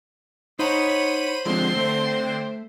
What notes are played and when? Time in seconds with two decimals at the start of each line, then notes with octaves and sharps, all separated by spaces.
0.59 D#4 C5 C#5 F#5 A#5 B5 D#7
1.46 D3 F3 G#3 C4 C6
1.76 A3